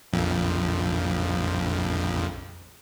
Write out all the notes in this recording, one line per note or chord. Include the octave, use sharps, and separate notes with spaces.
A#1 F2